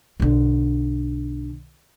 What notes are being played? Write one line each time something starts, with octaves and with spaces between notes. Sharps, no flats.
B1 D3